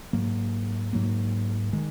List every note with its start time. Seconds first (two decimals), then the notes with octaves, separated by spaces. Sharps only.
0.13 G#2 F#3 A#3
0.93 G#2 F#3 A#3
1.73 D#3 G#3